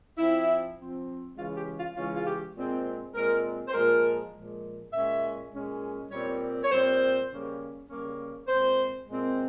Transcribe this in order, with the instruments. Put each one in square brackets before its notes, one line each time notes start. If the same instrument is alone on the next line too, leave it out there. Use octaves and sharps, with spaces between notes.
[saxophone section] F3 C4 E4
F3 C4
C#3 E3 G#3 C#4 F4
G4
F4
C#3 E3 G#3 C#4 F4
F4
G4
A#2 G#3 C4
A#2 G#3 C4 A#4
C5
A#2 F3 G#3 A#4
A#2 F3 G#3
A#2 G#3 C#4 E5
A#2 G#3 C#4
A#2 G3 C4 C#5
C#5
A#2 G3 C4 C5
C#3 G3 A#3 C#4
C#3 G3 A#3 C#4
A#2 G#3 C4 C5
A#2 G#3 C4